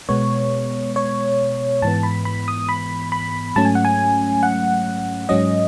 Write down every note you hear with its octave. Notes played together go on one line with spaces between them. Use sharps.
B2 G#3 B3 C#5
C#5
G#2 E3 B3 A5
B5
B5
D#6
B5
B5
G#2 F#3 A3 C#4 A5
G#5
F#5
G#5
F#5
G#2 F#3 C#4 D#5